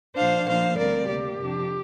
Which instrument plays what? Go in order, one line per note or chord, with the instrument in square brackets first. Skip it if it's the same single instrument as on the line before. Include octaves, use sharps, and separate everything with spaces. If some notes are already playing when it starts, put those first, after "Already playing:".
[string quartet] A#2 F3 D4 C5 F5
A#2 F3 A#3 D4 C5 F5
D2 D3 G3 C4 A#4 D5
D2 C3 A#3 G4
F2 C3 F3 D4